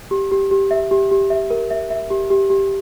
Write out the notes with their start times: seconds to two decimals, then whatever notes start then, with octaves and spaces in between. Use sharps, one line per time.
0.11 G4
0.31 G4
0.51 G4
0.71 E5
0.91 G4
1.11 G4
1.30 E5
1.50 A#4
1.71 E5
1.90 E5
2.10 G4
2.30 G4
2.50 G4